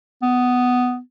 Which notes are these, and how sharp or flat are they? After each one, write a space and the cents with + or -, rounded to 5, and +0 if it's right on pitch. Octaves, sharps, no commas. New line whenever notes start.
B3 +10